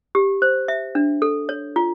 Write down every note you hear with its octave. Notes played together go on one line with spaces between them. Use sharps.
G4
C5
E5
D4
A4
C#5
F4